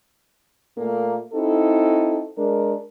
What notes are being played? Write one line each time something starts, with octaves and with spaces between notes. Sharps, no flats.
A#2 A3 A#3
C4 D#4 E4 F#4 A4
G#3 D4 A#4